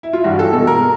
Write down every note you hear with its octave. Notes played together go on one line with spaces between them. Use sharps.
E4
F4
G2 E3 G3 F#4
A4
B2 G#3 A4
A#4